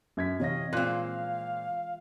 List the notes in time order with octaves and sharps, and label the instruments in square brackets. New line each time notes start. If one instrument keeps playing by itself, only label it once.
[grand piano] F#2 G#6 B6
[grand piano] C3 A#6 [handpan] E3 C#5 F5 [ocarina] D#5
[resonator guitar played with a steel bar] A#2 C4 [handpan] G#3 F4 A#4 [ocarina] F5 [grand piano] F#6